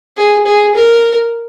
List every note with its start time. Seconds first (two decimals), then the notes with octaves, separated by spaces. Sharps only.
0.17 G#4
0.46 G#4
0.75 A#4